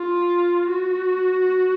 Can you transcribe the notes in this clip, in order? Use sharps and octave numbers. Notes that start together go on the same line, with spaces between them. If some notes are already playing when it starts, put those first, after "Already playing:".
Already playing: F4
F#4